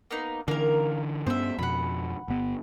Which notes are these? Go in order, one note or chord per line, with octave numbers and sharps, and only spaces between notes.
A#3 B3 D#4
D3 E3 A#3 A#4
G2 B3 C#4 C5 E5
F2 B2 F#5 B5
G1 B3